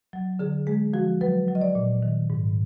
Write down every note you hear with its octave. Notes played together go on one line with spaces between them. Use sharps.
F#3
D3 G#4
G#3 G#4
F3 F#4
F#3 B4
F#3
D#5
D5
A#2
D#3
G#2